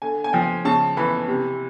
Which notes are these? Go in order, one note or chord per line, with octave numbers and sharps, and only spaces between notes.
D3 G#5
G#5
F3 G5
C#3 A5
E3 B5
C3